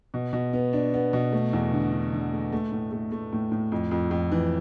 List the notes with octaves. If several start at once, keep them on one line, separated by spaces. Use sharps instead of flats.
B2
B2
B3
D4
B3
B2
A3
E2
D3
D3
D3
A3
A3
A2
A3
A3
A2
A2
F2
F2
F2
E3